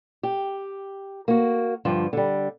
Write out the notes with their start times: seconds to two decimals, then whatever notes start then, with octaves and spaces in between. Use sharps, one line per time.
0.23 G4
1.28 A#3 F#4
1.85 G2 D3 F3
2.13 D3 G3